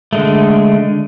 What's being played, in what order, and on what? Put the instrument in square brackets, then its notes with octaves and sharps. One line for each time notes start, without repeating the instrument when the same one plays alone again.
[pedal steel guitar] D3 G#3 A3